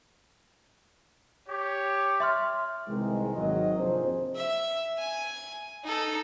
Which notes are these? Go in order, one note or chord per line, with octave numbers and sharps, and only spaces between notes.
G4 C#5
E5 C6 F6
C2 C3 D#3 E3 G#3
G#1 D#3 F#3 D#5
F2 C3 A#3 D4 G#4 C5
E5
G#5
D#4 A4